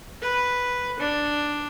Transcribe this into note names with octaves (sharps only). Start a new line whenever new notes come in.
B4
D4